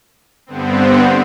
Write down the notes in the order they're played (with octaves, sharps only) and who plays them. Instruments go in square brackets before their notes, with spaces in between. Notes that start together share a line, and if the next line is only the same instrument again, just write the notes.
[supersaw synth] G2 D3 B3 C4